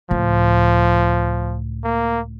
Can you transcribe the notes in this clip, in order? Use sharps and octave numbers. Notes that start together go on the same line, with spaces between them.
C#2 A2 F3
A#3